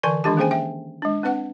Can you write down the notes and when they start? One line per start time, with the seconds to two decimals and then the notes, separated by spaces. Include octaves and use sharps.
0.03 D3 E3 D5 G#5 C#6
0.24 D#3 E3 G#3 D4 G4 A5
0.37 A#3 C#4 G#4 C5 G5 G#5
0.51 E5 G5
1.02 G#3 D4
1.23 C4 D4 B4 F#5